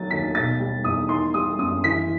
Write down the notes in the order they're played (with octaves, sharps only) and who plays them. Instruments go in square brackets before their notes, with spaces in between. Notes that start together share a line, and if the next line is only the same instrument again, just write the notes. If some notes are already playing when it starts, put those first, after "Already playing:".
Already playing: [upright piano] D#3 F#3 A6
D#2 B6
B2 A6
G3
E2 D#6
D#3 C6
G3 D#6
F#2 D#6
E3 B6